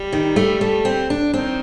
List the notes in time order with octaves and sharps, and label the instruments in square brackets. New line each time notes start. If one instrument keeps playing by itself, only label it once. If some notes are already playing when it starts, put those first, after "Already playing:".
Already playing: [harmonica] G3
[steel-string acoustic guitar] D#3
A3
A3
C4
D4
[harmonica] D#3 [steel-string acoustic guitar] C4